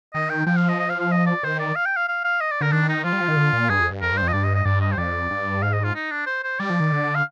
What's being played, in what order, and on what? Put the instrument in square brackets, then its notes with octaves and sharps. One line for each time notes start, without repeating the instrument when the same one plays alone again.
[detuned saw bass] D#3 [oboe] D#5
[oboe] G5
[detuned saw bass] F3 [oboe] G5
[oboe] F5
D#5
D#5
F5
F5
D#5
D5
[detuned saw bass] D#3 [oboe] C5
[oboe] D5
F5
G5
F5
F5
F5
D#5
D5
[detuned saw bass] D3 [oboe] A#4
[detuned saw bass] D#3 [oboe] D4
[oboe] D#4
[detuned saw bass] F3 [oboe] F4
[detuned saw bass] G3
F3
D#3
D3
A#2
[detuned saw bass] G2 [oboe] G#4
[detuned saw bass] F2
G2
[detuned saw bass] F2 [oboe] A#4
[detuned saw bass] G2
[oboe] C5
[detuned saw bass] F2
[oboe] D#5
[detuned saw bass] G2 [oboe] D5
[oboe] D#5
D#5
[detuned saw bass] G2 [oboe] D5
[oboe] D#5
C5
[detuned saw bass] F2 [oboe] D5
[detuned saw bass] G2
[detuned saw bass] G#2 [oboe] F5
[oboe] D#5
F4
D#4
D4
C5
C5
[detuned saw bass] G3 [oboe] D5
[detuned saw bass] F3
D#3
D3
[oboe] F5